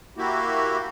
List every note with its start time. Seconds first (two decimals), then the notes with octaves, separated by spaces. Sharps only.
0.18 A#3 E4 F#4 G4